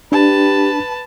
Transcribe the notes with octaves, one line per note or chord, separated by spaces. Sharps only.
D4 G4 B4 A5